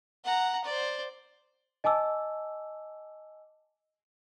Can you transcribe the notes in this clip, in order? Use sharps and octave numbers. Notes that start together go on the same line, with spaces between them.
F#5 A#5
C5 D5
D#5 G#5 A5 D6 E6